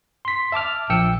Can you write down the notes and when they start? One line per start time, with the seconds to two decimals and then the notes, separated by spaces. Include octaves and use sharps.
0.25 C6 B6
0.52 E5 A5 D6 F6
0.90 A#1 G5 E6 C#7